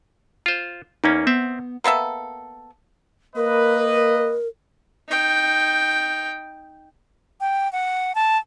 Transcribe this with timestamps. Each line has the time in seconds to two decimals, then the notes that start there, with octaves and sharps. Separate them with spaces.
0.46 F4 C5
1.04 E2 A#3 C#4 D#4
1.27 B3 C4 E5
1.84 A#3 B3 A4 E5
3.36 A#3 A#4 B4 D#5
5.08 D#4 G5
7.41 G5
7.72 F#5
8.15 A5